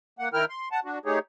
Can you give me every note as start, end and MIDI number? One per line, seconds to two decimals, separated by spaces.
0.19 0.29 58
0.19 0.29 78
0.34 0.45 51
0.34 0.45 64
0.34 0.45 70
0.34 0.45 79
0.34 0.45 89
0.49 0.69 84
0.72 0.80 78
0.72 0.80 81
0.85 0.99 62
0.85 0.99 66
1.06 1.19 57
1.06 1.19 63
1.06 1.19 67
1.06 1.19 68
1.06 1.19 73